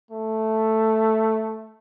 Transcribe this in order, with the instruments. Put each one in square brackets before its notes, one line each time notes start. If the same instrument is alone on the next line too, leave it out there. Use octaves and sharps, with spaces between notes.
[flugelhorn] A3